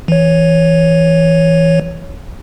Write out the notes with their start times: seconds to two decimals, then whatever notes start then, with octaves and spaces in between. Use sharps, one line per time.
0.08 E3 C#5